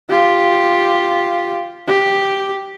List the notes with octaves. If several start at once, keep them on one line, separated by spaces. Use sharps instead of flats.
F4 G4
G4